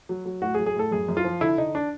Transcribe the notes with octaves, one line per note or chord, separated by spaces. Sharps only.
F#3
F#3
A2 F#4
G#4
F#3
G#4
A2 A4
F#2 G#4
F#2
F4
F3
D3 E4
D3 D#4
D4